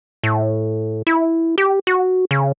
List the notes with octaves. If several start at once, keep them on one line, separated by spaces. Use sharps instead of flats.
A2
E4
G4
F#4
C#3